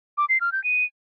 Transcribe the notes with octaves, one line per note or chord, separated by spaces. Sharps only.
D6
C7
F6
G6
D#7